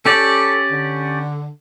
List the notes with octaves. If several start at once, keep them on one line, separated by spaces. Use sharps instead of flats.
C#4 G4 A4 D5
D3